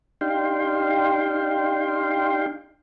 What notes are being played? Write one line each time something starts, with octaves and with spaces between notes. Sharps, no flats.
D4 D#4 G4 F5 G5 C6